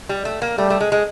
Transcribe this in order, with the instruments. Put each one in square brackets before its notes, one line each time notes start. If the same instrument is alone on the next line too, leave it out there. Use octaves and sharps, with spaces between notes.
[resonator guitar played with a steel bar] G3
A3
A#3
[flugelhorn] G3 [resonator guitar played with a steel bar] A3
[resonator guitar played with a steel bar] A3
G#3
G#3